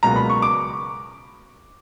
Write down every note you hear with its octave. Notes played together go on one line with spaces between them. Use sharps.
C#2 B2 F#3 A#3 A#5
B5
C#6
D6